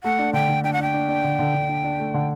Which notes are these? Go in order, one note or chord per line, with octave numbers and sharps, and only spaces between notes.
A3 F#5
D4
D3 G5
D3
D4 G5
F#5
D4 G5
D4
D4
D3
D3
D3
D4
D4
A3
D3